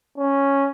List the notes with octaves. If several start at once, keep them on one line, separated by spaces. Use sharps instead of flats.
C#4